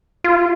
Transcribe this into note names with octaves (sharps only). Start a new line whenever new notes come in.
F4